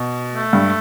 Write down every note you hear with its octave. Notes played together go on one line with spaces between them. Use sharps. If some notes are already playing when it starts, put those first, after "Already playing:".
Already playing: B2
A3
G2